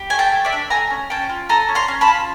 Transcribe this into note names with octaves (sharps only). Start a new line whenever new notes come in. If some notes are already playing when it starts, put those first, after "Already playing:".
Already playing: G4
A3 G#5
G5 A5
A3
D5 E5
D4
A4 G#5 A#5
C#4
C#4 G5 A5
F4
A4 G#5 A#5
C#4
A#5 C6
C#4
A5 B5
F4